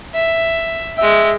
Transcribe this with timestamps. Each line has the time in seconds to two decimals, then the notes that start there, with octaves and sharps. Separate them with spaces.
0.14 E5
0.98 G#3 E5 G5